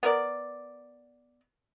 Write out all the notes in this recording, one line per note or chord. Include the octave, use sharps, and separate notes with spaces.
B3 A#4 D5